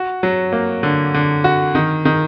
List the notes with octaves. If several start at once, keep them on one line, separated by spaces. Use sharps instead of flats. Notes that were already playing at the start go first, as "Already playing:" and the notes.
Already playing: F#4
F#3
A#3
D3
D3
F#4
D#3
D#3